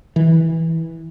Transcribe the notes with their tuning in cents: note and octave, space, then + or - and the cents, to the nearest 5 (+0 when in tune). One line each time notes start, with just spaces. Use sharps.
E3 -15